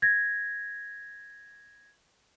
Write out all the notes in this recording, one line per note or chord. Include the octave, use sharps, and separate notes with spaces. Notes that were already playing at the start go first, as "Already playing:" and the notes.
G#6 A#6